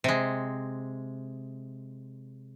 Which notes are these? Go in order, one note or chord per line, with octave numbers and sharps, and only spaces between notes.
C3 G#3